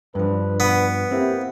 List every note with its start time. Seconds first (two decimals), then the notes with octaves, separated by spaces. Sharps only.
0.15 G2 F3 D4 B4
0.60 B3
1.11 A#3 C4 E4 G4